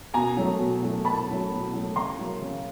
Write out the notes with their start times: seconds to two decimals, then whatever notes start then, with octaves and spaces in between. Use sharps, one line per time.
0.14 B2 G#5 A#5
0.37 F#3 A3
0.59 B2
0.82 F#3 A3
1.05 B2 A5 B5
1.28 F#3 A3
1.50 B2
1.73 F#3 A3
1.96 C#3 A#5 C6
2.19 F#3 A#3
2.42 C#3